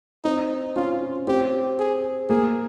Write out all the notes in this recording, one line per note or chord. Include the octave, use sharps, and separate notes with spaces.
C4 D#4
C#4 F4
C4 G4
G#4
A#3 G#4